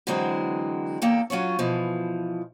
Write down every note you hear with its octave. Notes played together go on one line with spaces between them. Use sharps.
D3 E3 F#3 G#3 C4
E2 A#3 A4 G5
F#3 C#4 F4 C#5
B2 E3 F3